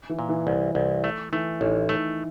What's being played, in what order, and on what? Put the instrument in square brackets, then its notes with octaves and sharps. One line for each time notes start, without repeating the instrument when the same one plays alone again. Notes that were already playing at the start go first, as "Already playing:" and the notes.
[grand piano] E3
[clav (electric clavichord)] A#2
[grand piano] E3
[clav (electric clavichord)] C2
C2
A3
[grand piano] E3 [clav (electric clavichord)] A3
[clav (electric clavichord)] A1 [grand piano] D#3
[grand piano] D#3 [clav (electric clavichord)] A3